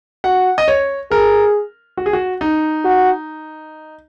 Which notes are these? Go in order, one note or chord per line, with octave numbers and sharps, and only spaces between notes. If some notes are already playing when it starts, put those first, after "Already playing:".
F#4 F#5
D#5
C#5
G#4 A#4
F#4
G#4
F#4
D#4
F#4